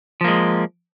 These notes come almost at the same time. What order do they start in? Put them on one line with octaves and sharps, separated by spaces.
F3 A#3 G#3